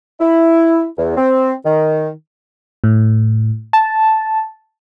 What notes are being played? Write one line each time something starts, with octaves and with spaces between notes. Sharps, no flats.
E4
E2
C4
D#3
A2
A5